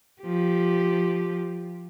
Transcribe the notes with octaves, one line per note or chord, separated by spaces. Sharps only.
F3 G4